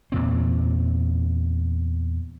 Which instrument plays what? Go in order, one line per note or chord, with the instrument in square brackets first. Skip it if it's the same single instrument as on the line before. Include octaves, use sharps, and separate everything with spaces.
[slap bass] E2 A#2 C4